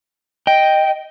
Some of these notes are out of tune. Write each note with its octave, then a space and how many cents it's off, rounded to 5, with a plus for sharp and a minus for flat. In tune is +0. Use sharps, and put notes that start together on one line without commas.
D#5 +0 G5 +0